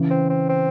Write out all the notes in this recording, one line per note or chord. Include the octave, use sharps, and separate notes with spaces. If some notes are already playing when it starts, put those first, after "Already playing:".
Already playing: C#3 E3
C4
C4
C4